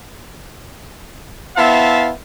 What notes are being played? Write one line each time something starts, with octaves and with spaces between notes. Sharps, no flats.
B3 E4 C5 E5 F5 A5